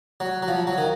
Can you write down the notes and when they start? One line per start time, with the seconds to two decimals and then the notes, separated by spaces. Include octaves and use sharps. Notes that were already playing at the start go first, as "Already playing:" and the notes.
0.20 F#3
0.42 F#3
0.48 F3
0.67 F#3
0.78 D#3